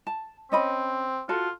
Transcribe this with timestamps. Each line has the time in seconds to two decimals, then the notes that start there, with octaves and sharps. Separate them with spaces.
0.07 A5
0.52 C4 C#4 D#5 B5
1.29 F4 F#4 A4 A5